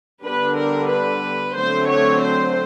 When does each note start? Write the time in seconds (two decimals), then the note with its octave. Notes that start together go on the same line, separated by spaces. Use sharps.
0.23 D3 G3 B3 D4 B4
0.57 A#4
0.90 B4
1.57 D3 F#3 A3 C4 C5
1.89 C#5
2.23 C5